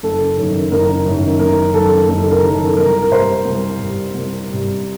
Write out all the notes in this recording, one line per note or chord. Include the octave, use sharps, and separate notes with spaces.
F#1 A4
F#2 D#3
F#1 A#4
F#2 D#3
F#1 A#4
F#2 D#3 A4
F#1 A4
A#4
F#2 D#3
A4
C2 A#4
A#4
C3 G3 C5
C2
C3 G3
C2
G3
C3